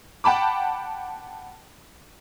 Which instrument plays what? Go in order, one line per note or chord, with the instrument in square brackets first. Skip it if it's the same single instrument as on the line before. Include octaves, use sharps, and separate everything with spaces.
[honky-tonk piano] F#5 G5 A5 B5 D6